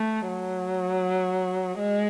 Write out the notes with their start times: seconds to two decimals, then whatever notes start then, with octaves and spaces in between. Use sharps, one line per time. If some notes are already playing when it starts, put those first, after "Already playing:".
Already playing: A3
0.28 F#3
1.79 G#3